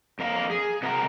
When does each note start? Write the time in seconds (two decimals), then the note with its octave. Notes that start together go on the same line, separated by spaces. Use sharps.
0.19 F2 A#4 F5
0.50 G#4
0.82 C3 F#4 A#4 A5 A#5